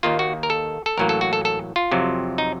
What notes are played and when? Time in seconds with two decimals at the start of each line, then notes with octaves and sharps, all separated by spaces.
0.03 D#2 D#3 A#3 F4
0.19 F#4
0.43 A#4
0.50 A4
0.86 A4
0.98 A1 A2 F#3 A#3 A#4
1.09 A4
1.21 F#4
1.33 A4
1.45 A4
1.76 F4
1.92 F2 C3 F#3
2.38 D#4